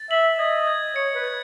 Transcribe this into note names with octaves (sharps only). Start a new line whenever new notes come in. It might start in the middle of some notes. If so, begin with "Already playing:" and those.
Already playing: A6
E5 F#7
D#5 G#6
G#6
C#5 C#7
B4
G#6